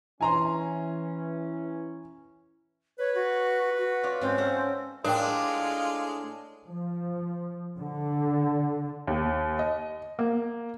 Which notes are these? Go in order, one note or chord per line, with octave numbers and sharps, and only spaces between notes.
E3 C#4 G#5 A#5 C6
B4 C#5
F#4
F#4
F4 C#5 D5
G#2 C4 C#4 F4
C#4 A4 F#5
A2 G#3 D4 F4 A#4 G5
F3
D3
D#2
D#5
A#3